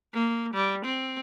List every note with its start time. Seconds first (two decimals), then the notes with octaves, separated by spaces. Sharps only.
0.14 A#3
0.54 G3
0.85 C4